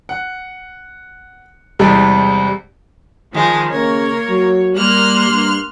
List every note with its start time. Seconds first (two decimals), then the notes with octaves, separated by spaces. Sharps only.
0.09 F#5
1.79 E2 C3 G3 G#3
3.33 D#3 F3 G#3 G#5
3.71 C#3 A#3 A#4 C#5
4.29 F#3
4.76 G3 A#3 C6 F6 F#6
5.28 G2